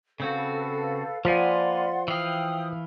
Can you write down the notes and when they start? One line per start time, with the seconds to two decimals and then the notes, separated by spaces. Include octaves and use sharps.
0.20 C#3 C4 F#4 A4 B4 F5
1.25 F3 A#3 B4 D5 F#5 G#5 C6
2.08 E3 F5 G5 D#6